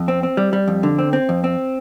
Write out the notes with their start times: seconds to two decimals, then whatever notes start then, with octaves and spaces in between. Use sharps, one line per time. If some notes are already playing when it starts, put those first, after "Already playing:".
Already playing: F2
0.08 C4
0.23 C4
0.37 G3
0.53 G3
0.68 F2
0.83 D3
0.99 C4
1.13 C4
1.29 F2
1.44 C4